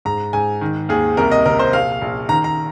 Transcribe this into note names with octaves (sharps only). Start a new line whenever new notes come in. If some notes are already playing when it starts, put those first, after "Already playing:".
G#2 A#5
G#2 G#5
D#3
D#2 G#4
C2 A#4
D#5
C3 A#4
C5
A#1 F5
A#1
D#3 A#5
A#5